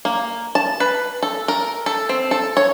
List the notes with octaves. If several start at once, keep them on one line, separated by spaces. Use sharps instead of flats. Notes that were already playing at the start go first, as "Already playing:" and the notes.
A#3
A5
B4
A4
A#4
A4
C4
A4
C#5